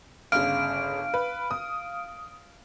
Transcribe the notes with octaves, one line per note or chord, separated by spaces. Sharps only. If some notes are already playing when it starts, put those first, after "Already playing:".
G1 C#3 F5 F6 D7
B4
D#6